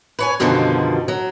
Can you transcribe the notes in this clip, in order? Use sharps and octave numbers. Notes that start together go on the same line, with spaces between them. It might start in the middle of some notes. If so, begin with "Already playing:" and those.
B4 C#5 G#5
F#2 B2 D3 D#3 F3 G3
F#3